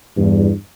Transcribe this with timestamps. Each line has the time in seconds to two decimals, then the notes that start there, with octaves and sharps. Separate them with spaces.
0.17 E2 G2